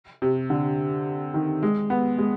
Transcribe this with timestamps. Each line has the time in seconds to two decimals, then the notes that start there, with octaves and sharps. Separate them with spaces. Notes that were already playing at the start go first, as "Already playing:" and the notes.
0.22 C3
0.50 D3
1.34 D#3
1.63 G#3
1.90 B3
2.18 G#3